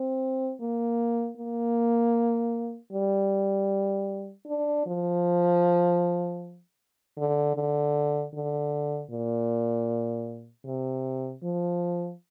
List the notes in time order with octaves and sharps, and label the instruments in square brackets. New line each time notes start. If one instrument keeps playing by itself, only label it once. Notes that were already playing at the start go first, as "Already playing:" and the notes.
Already playing: [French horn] C4
A#3
A#3
G3
D4
F3
D3
D3
D3
A#2
C3
F3